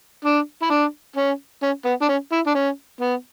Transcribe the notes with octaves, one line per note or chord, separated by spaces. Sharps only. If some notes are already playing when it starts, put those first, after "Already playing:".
D4
E4
D4
C#4
C#4
B3
D4
C#4
E4
D4
C#4
B3